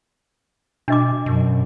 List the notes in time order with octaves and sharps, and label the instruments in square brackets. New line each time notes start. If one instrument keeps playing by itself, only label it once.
[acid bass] B2 [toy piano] D4 D#5 D6
[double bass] F#2 [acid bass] B2